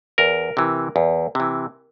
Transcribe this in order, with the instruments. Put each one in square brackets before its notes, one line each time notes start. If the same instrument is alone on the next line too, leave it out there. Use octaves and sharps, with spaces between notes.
[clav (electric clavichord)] E2 A#4
C3 E3
E2
C3 E3